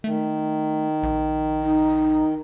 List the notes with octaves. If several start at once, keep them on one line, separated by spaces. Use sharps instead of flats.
D#3 A3
A#1
D#4